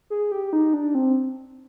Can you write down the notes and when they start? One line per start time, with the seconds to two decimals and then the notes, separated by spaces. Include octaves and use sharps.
0.10 G#4
0.32 G4
0.53 D#4
0.74 D4
0.95 C4